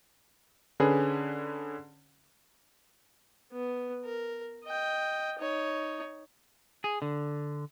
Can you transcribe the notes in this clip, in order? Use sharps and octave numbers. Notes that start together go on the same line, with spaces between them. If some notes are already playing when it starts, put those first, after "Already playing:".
D3 C#4 G#4 B4
B3
A#4
D#5 G5
D#4 C#5
G#4
D3